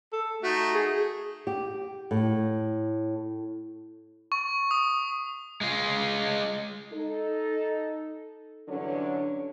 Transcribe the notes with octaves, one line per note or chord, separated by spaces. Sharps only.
A4
A3 D#4 F#4
G#4
G4
A2
C#6
D#6
G#3 F4
D#4 A4
G2 D3 E3 F#3 C#4 D4